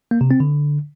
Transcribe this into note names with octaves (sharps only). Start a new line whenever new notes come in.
A#3
C3
C4
D3